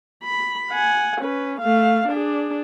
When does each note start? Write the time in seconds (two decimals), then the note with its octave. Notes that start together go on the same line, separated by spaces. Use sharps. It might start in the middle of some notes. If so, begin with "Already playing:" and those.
0.23 B5
0.72 F#5 G#5
1.21 C#4 B4
1.61 A3 F5
2.08 D4 G#4